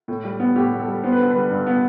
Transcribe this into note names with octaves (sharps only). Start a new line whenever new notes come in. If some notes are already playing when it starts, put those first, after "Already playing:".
A2
G3
B3
A2 G4
A2
A4
G3
B3 C5
B4
D3 A4
G3 B4
G2
B3